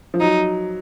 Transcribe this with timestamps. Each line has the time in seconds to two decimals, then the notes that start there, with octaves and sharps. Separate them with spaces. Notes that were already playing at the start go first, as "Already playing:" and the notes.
0.14 F3
0.20 F#3 D#4